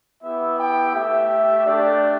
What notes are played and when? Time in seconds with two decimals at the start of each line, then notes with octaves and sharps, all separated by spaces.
0.23 B3 E4 G4 E5
0.59 G5
0.94 A3 G4 E5
1.65 A3 D4 G4 D5